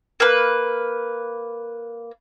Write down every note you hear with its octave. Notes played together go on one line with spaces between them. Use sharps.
A#3 B4